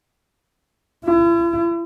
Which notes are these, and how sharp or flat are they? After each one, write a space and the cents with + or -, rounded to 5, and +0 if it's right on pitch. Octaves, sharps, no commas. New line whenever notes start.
E4 +45